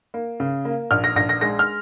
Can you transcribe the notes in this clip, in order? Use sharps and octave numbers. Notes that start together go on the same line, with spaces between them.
A#3
C#3
A#3
A#1 F6
A#6
A#1 A#6
A#6
G#3 A#6
F6